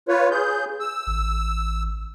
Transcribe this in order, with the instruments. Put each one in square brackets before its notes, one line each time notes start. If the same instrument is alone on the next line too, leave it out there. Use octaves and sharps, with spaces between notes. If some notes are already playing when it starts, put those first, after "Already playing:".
[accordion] F4 B4 C#5
G#4 G6
E6
[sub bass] A1